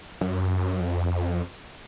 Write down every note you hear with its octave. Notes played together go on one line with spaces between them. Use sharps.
F#2
F2